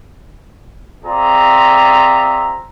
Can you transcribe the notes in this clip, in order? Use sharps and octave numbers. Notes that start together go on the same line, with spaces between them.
C4 F4 G#4 D5 E5 A#5